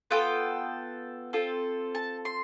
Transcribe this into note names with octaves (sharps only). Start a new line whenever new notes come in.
B3 F4 A4 G5
C4 F4 A4
A5
C6